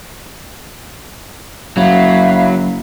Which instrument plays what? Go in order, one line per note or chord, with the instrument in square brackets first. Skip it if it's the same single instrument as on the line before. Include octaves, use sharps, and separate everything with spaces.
[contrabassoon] F#1 [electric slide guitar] F#3 [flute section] E5 F5 B5